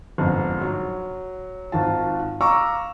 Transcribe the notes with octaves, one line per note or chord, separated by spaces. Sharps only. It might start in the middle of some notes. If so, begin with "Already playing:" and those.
G1 F2 G#2
F#3
G#1 D#3 F4 A5
F5 A#5 C#6 D6 E6